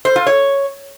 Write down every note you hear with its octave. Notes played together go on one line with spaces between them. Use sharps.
C5
F4
C#5